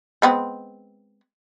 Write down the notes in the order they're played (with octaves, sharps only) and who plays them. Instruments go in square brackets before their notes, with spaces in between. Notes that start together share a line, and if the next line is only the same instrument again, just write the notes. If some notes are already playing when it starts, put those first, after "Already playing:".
[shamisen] G#3 B3 C4